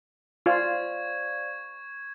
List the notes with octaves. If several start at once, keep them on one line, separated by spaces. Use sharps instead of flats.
F4 C5 D5 F5 C#6 G#6